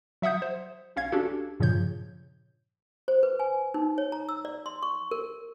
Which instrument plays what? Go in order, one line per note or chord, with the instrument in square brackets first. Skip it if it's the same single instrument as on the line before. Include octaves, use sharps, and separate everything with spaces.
[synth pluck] F#3 E5 F#5 D#6 G6
C5
B1 C#4 F5 G#6
C#4 D4 F#4 G4 A4
G2 A#2 C#3 F3 C#5 G6
[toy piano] C5
B4
G#5
D#4
C#5
A#5
E6
D5
C6
C#6
A#4